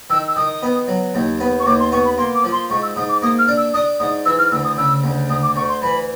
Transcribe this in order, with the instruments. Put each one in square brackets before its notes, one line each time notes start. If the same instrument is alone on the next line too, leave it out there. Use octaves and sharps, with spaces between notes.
[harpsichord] D#3 [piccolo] E6
[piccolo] E6
[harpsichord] D#3 [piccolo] D#6
[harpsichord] B3
F#3
D#2
B3
[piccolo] C#6
[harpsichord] D#2 [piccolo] D6
[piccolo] C6
[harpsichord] B3 [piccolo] C#6
[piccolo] B5
[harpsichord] A#3 [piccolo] C6
[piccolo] D6
[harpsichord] F3
[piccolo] C6
[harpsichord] G#2 [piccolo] C#6
[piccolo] E6
[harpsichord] G#2 [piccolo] D#6
[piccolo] D6
[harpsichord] A#3 [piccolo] D#6
[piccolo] F6
[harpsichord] D4
[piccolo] E6
[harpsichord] D4 [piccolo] D#6
[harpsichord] G#2 [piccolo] D#6
[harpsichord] E3 [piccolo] E6
[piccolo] F6
[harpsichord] D2 [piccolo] E6
[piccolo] D#6
[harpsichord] C#3 [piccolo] E6
[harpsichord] D2
[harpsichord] D2 [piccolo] D#6
[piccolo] D6
[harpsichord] D2 [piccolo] C#6
[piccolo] C6
[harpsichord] E3 [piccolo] B5